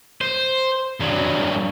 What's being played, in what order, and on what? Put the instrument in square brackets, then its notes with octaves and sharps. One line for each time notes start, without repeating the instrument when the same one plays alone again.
[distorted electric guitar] C5
G2 F#3